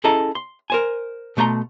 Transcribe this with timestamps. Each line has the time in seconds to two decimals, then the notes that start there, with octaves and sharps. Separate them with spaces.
0.04 C#4 E4 G#4 A4 D#5 A#5
0.35 C6
0.70 A#4 C5 G#5
1.37 B2 A3 E5 A#5 C6